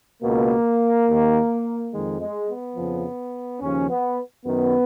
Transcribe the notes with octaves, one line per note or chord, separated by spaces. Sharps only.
C#2 B2 A#3
D#2 D#3
F2 D#3 G#3
G#3
B3
F2 C#3 F3
D#2 C#3 F3 C#4
B3
F#2 D#3 B3